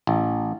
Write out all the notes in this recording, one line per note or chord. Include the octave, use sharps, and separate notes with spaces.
A1